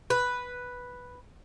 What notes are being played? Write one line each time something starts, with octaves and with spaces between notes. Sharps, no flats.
B4